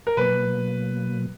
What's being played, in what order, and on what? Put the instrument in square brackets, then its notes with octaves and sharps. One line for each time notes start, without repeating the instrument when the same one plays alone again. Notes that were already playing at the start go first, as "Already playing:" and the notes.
[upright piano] A#4
[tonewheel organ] B2 F#3 A#3 [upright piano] B4